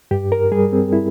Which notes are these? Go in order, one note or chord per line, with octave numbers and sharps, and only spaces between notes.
G2 G4
A#4
G3 G#4
C4
E4